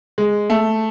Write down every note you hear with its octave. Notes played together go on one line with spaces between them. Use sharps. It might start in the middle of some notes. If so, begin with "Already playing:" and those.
G#3
A3